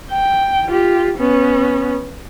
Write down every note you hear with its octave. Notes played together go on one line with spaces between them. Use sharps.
G5
F4 G4
B3 C#4